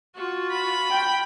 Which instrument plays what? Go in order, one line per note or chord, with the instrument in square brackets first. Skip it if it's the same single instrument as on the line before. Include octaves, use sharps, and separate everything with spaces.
[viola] F4 F#4
[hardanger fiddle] B5
[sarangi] G5